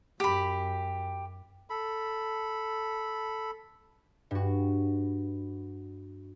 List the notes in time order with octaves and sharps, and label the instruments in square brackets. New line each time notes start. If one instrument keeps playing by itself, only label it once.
[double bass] F#2 [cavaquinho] G4 B5
[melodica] A4 B5
[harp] G2 F#4